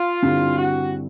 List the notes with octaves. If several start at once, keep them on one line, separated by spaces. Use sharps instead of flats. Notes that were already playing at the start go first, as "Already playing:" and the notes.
Already playing: F4
G2 D3 G3 C4 E4
F#4